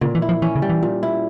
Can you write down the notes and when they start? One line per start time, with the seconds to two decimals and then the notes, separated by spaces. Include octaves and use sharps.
0.01 A#2 C#3
0.15 E3
0.22 E4
0.29 F3
0.42 E3 C#4
0.56 C#3
0.62 G3
0.69 E3
0.83 A#2
1.03 E4